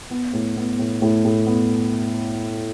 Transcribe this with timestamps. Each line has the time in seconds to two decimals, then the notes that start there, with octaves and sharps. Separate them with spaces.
0.11 B3
0.33 A2
0.57 B3
0.79 A2
1.02 A2
1.25 A2
1.46 B3